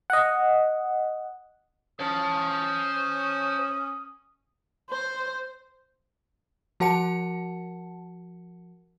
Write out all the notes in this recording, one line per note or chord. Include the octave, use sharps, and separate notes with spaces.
D#5 F#5
C#4 C5 A5 D#6
C5
F3 F#4 A#4 F#5 A5 C#7